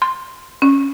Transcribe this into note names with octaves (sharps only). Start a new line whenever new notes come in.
C6
C#4